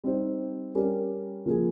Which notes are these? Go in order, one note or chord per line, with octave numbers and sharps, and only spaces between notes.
G3 C4 D#4 G4 C5
G3 C#4 G4 A#4
F3 A#3 F4 G#4